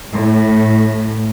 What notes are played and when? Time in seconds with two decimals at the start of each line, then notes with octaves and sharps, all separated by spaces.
0.12 A2